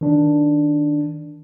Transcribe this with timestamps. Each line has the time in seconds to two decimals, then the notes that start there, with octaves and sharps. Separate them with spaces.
0.01 D#3 D4